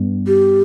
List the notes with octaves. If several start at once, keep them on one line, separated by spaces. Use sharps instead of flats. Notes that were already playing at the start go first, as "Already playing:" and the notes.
Already playing: G2 B3
G4